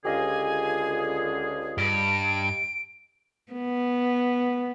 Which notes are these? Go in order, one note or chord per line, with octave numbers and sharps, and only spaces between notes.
C#2 D3 G4 G#4 D#5 F5 G#5
G2 D7
B3